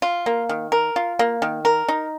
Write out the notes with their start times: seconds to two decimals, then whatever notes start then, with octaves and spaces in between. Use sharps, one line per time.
0.02 F4
0.26 A#3
0.49 D#3
0.72 A#4
0.96 F4
1.19 A#3
1.42 D#3
1.65 A#4
1.89 D#4